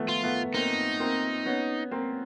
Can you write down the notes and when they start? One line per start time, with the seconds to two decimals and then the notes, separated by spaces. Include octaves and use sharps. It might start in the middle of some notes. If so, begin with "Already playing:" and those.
Already playing: D#3 F3 A3 B3
0.08 F4
0.23 A3 B3
0.54 A#3 C4 D#4
1.00 A#3 C4
1.46 B3 C#4
1.91 A#3 C4